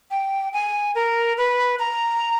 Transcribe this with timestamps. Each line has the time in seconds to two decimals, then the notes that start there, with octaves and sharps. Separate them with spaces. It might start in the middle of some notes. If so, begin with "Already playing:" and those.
0.11 G5
0.53 G#5
0.95 A#4
1.38 B4
1.79 A#5